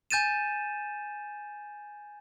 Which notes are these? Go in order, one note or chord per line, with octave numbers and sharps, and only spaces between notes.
G#5 G6 A6 D#7 E7